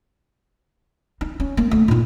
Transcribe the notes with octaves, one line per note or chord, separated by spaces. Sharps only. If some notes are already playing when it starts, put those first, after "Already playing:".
D#4
C#4
A#3
D2
A#2 D#4